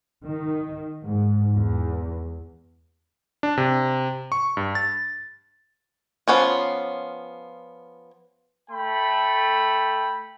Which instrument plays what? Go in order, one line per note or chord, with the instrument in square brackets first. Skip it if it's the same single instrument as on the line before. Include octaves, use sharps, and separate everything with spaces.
[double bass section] D#3
G#2
E2
[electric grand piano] D4
C3
C#6
G2
A6
[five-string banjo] F3 B3 C#4 F4
[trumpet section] A3 G5 B5